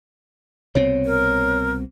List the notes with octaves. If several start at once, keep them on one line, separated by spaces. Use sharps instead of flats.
C2 B2 C4 C#5
A#4